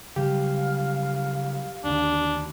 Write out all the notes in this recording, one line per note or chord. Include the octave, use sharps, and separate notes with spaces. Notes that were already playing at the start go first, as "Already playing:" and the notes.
C#3 F#3 G3 G4 F5
D#2 D3 D4